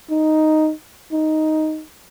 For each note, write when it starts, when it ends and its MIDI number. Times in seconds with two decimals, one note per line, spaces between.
0.10 0.72 63
1.13 1.83 63